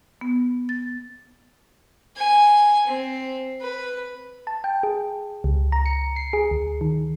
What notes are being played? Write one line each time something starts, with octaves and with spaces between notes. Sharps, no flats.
B3
A6
G#5
C4
B4
A5
G5
G#4
C#2
A#5
C#7
C7
G#4
D2
D#3